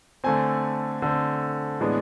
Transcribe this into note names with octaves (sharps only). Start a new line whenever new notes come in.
D3 A3 C4 G#5
D3 A3 C4
A2 E3 G#3 B3 D4